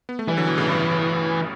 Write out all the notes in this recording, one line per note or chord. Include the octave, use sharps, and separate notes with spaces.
B3
A3
E3 G3
D3 F#3
B2 D3
A2 C#3
G2